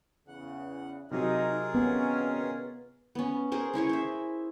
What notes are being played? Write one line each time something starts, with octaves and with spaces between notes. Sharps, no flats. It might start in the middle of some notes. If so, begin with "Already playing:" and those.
E2 C#3 F#5
C3 F#3 D#4 F4 G#4 A#4
A#2 D#3 B3 C#4
B3 C#4
G#4 A#4 C5
C#4 E4 G#4 C#5
C5 E5